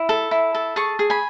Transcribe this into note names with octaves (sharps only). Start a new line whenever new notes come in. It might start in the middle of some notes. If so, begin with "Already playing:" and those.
Already playing: E4
A4
E4
A4
G#4 A5 C#6
G#4
G#5 B5